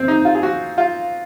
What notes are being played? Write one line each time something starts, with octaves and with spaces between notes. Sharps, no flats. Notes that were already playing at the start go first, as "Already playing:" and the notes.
Already playing: C4
D#4
F4
G#4
F#4
F4